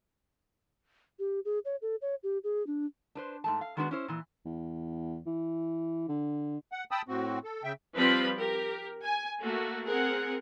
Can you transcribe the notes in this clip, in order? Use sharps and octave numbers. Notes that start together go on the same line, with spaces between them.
G4
G#4
C#5
A4
C#5
G4
G#4
D4
D4 B4 C5
G#2 A3 A5
F5
D#3 G#3 B3 D4 F#4 B4
C#4 E4 C5
A#2 E3
E2
E3
D3
F#5
G5 A5 B5 D#6 E6
A2 C4 F#4
A4
C#3 E5 G5
F3 G3 C4 F4 B4 B5
G4 A#4
G#5
A3 A#3 F#4
C4 G#4 A#4 F#5